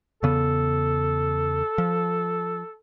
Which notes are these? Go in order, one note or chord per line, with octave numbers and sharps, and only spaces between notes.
E2 C#3 B3 A4
F3